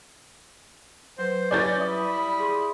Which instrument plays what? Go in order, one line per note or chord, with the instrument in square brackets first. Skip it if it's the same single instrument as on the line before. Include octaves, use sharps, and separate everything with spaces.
[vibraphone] F#3 B4 [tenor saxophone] C5
[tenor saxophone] C#4 [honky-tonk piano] D5 G6 A6
[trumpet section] G3 B5 D#6 [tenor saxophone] E4
[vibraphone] G#4 C6